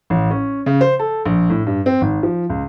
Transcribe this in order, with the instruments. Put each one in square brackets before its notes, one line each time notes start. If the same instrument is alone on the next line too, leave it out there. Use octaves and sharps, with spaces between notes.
[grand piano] A1
C#4
C#3
C5
A4
A#1
A2
G2
C4
G#1
F3
C#2